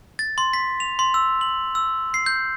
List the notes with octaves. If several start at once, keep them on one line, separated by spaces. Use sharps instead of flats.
A6
C6
B6
F7
C6
E6
F#7
E6
C7
G6